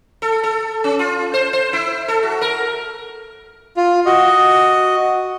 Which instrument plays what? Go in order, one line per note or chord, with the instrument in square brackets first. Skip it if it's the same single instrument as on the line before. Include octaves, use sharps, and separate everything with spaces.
[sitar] A4
A4
C#4
F4
C5
C5
E4
A4
F#4
A#4
[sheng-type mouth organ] F4
F#4 D#5